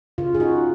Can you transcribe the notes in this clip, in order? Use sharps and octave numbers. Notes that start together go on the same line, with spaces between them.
C#3 F4
G#4
D#4 F#4